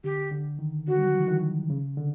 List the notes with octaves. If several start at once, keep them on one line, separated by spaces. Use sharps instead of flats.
D3 G4
D3
D#3
D3 F#4
G3
F#3
F3
E3
D#3
C#3
D3